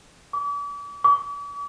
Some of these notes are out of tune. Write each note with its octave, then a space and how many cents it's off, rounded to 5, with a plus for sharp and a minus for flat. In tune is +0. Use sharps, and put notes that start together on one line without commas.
D6 -40
D6 -45